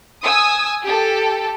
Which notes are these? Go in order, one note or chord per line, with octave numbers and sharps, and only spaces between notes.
G#5 D#6 E6
G4 A4